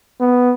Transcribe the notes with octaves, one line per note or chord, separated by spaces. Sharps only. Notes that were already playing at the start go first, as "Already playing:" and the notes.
B3